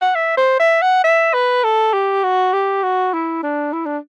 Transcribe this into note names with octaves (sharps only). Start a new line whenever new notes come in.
F#5
E5
C5
E5
F#5
E5
B4
A4
G4
F#4
G4
F#4
E4
D4
E4
D4